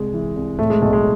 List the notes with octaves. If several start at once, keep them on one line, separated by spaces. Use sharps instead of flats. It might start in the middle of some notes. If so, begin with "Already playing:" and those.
Already playing: C2 C3 G#3
E3
C2
A2 A3
G#3
B1 A3
G#3